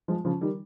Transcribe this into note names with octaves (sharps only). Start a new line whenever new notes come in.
F3 G#3
C#3 F3
D#3 G3